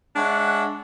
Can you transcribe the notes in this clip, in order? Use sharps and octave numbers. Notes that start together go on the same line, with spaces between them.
G#3 D4 C#5 E5 F#5